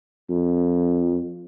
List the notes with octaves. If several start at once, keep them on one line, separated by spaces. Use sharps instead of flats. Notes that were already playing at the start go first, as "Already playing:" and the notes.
F2